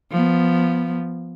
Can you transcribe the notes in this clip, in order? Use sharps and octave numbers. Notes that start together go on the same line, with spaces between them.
F3 B3